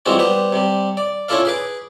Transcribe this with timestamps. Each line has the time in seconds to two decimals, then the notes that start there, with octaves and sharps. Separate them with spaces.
0.06 E3 G3 G#3 C4 F4 F#4
0.18 G3 B3 B4 C5
0.52 C3 G3
0.97 D5
1.29 C#4 E4 F4 A4 D5 F5
1.45 G#4 B4 D6